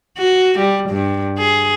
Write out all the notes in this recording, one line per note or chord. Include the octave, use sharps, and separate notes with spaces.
F#4
G3
G2
G#4